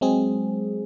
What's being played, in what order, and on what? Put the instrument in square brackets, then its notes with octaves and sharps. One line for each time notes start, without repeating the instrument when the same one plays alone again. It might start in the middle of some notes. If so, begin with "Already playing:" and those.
[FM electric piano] F#3 G#3 C4 G#4